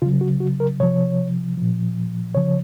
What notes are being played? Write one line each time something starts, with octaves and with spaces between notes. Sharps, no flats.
C#3 F#3 F4
F#4
F#4
A#4
C3 F3 C#5
A#2 F3
C#3 F3 C#5